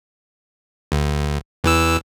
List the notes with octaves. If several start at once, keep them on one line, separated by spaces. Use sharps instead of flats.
D2
E2 E3 E6